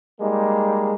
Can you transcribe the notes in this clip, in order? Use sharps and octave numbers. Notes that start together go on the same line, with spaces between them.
G3 G#3 A#3 D#4